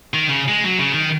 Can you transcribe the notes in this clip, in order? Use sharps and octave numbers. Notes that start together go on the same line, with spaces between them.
D#3
C#3
G#3
F#3
C#3
D#3